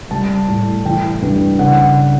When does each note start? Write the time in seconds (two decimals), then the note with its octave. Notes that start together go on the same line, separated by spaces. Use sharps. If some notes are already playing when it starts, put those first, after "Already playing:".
0.11 G3 A5
0.48 A2
0.85 E3 G5
1.22 G2
1.59 C#3 F#5